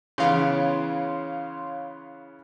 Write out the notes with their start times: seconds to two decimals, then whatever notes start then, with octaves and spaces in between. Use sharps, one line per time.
0.18 C#3 E3 B3 C#5 F5 C6